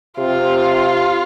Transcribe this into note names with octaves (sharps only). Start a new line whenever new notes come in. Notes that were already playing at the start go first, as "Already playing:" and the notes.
C3 F4